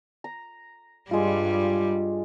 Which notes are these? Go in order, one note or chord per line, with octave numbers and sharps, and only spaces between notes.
A#5
G2 G3 G#3 F4